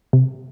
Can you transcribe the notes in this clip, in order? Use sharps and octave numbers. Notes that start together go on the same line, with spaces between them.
C3